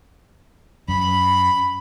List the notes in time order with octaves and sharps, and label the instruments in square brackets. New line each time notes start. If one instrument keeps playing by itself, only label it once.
[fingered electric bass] F#2 [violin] B5